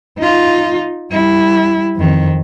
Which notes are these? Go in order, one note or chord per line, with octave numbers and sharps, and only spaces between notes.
D#4 F4
G3 E4
F2 D#3